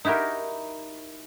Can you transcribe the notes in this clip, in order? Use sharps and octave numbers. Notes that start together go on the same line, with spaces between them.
D#4 E4 F#4 G4 A#4